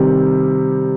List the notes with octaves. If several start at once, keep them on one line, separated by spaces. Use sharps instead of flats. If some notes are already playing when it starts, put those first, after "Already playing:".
Already playing: C3 D#3 G3